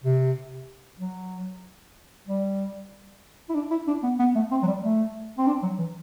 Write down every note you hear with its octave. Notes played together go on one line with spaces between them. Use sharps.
C3
F#3
G3
E4
D4
E4
D4
B3
B3
A3
C4
F#3
G3
A3
C4
D4
F#3
E3